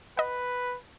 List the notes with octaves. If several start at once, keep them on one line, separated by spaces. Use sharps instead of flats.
B4 D#5 F#5